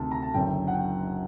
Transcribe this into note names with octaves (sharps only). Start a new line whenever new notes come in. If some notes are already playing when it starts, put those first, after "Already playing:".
Already playing: D2 C3 D#3 A5
A#5
A5
F#1 F#2 D3 F#3 G5
F#5
G5